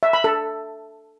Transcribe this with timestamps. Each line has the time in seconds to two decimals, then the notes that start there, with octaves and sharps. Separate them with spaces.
0.03 E5
0.13 B5
0.24 A4